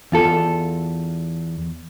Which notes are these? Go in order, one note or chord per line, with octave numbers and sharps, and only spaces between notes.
E2 F4 A4